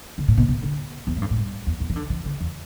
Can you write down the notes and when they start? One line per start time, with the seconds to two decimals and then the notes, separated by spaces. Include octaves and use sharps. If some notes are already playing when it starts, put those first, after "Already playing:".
0.18 D3
0.28 A2
0.37 B2
0.48 B2
0.63 D3
1.07 E2
1.16 A2
1.22 G2
1.30 A2
1.36 G2
1.67 E2
1.80 E2
1.89 E3
1.96 D3
2.10 E3
2.25 D3
2.40 E2